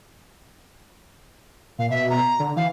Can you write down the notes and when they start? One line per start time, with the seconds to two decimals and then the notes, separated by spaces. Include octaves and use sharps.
1.79 A#2 F5
1.90 B2 E5
2.10 A#5
2.40 D3
2.56 E3 F5